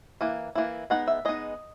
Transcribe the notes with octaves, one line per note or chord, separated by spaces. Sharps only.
E3 A#3
E3 A#3 E4
G#3 B3 D#4 F#5
E5
G#3 B3 D#4 D#5